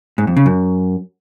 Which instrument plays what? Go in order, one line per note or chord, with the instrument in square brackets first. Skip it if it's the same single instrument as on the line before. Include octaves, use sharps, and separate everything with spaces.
[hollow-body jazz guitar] G#2
F2
C#3
F#2